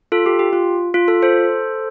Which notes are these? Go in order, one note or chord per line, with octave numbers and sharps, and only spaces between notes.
F4 A4
G4
G4
F4
F4
F4 A4
A4 C5